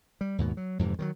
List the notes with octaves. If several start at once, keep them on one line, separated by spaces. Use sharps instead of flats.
G3
D#2 G#2 B2
F#3
F2 G#2 C3 E3
D#3 F3 F#3